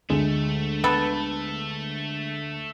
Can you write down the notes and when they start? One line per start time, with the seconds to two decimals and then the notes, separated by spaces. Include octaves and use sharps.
0.10 D2 G#3 A3
0.84 B3 A4